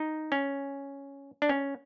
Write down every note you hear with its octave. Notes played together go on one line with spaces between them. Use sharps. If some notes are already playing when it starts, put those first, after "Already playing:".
Already playing: D#4
C#4
D4
C#4